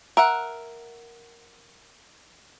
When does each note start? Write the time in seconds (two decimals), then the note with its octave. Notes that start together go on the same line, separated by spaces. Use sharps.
0.17 A#4 E5 F#5